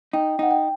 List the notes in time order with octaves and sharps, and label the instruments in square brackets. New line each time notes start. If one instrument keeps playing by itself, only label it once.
[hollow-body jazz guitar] D#4 [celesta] G5
[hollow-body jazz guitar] D#4 [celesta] F#5
[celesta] G5